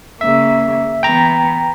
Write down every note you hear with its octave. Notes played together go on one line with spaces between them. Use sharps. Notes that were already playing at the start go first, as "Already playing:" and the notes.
C#3 A#3 E5
E3 B3 G5 A#5